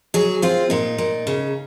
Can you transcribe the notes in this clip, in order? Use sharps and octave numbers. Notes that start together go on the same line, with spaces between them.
F#3 G#4
C4 F4
A#2 D#4
A#2
C#3